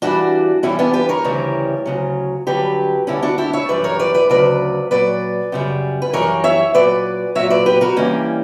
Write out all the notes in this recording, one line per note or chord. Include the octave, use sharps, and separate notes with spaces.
G2 E3 G3 D4 F#4
G2 E3 G3 C#4 E4
B3 D4
G4 B4
A#4 C#5
D2 C#3 E3 G3
D2 C#3 F#3
G2 D3 F#3 G4 B4
D2 D3 G3 C#4 E4
D4 F#4
E4 G4
C#5 E5
F#2 E3 G3 B4 D5
A#4 C#5
B4 D5
B4 D5
D2 C#3 F#3 B4 D5
A#2 F#3 B4 D5
F#2 C#3 G3
B4
F#2 E3 G3 A#4 C#5
C#5 E5
A#2 F#3 B4 D5
A#2 F#3 C#5 E5
B4 D5
G4 B4
F#4 A#4
G2 E3 G3 A#3 C#4